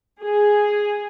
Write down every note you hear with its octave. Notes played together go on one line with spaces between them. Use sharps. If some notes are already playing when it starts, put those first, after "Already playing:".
G#4